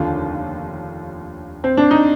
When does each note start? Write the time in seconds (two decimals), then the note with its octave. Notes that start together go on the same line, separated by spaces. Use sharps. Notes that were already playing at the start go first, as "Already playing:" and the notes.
Already playing: F1 D#2 D3 F4
1.64 C4
1.77 D4
1.91 D#4